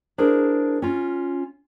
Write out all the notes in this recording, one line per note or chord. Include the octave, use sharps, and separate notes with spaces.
D4 E4 G#4 A#4 C5
C#4 F4